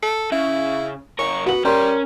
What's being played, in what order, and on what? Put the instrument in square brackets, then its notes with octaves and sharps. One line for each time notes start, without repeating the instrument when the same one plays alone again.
[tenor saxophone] A4
[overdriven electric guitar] C#3 [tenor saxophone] E4
[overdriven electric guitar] C#3 A#4 [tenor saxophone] C#5
[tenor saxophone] B3 [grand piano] F#4 F#7
[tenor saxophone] G3 [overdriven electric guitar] C#4 [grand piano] A#4 A#5 C6